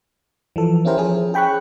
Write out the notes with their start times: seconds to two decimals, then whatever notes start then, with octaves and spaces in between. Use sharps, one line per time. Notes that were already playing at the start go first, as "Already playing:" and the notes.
0.56 E3 F3 A4
0.85 B3 C#4 E4 G4 A#4 C5
0.97 F3 C#4 G#4
1.34 G#4 G5 B5 C#6 F#6